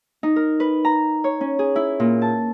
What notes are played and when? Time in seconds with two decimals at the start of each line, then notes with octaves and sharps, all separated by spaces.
0.23 D#4
0.36 A#4
0.60 B4
0.85 A#5
1.24 C#5
1.41 C#4
1.59 G#4
1.76 E4
2.00 A#2
2.22 A5